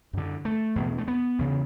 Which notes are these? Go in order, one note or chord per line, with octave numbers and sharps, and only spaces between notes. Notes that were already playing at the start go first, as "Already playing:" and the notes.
F#2 D3
A3
E2 B2
A3
B3
E2 C#3